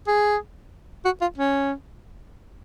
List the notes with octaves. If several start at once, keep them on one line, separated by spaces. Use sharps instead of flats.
G#4
F#4
F4
C#4